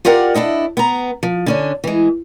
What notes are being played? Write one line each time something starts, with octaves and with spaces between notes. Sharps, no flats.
F4 G4 A#4 D5 F#5
D4 E4 A4 D#5
B3 A#5
F3
D3 C#4 D4
E3 G#3